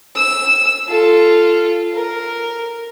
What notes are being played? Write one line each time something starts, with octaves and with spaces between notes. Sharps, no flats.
E6
F4 A4
A#4